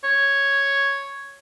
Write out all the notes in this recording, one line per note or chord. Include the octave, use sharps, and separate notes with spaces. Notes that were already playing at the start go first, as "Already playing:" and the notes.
C#5